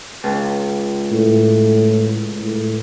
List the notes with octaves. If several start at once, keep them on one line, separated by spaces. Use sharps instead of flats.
C#2
A2
A2